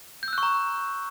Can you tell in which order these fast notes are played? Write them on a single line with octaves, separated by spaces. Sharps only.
G6 E6 F#6 C#6 A#5